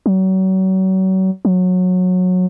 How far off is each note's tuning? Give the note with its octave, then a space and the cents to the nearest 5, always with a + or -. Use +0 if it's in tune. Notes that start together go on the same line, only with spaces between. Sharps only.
F#3 +35
F#3 -20